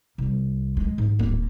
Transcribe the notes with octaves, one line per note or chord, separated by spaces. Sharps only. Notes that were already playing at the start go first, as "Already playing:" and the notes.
C2
G#3
G#2
D1 A#3